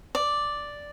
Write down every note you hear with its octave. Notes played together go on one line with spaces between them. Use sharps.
D5